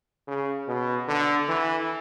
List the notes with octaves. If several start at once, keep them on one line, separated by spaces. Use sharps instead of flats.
C#3
B2
D3
E3